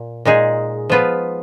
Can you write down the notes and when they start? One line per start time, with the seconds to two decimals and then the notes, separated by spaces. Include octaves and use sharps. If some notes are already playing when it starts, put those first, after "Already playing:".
Already playing: A#2
0.25 A#2 G#3 D#4 G#4
0.90 F3 B3 F4 B4